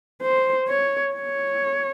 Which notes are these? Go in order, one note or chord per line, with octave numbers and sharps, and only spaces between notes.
C5
C#5
C#5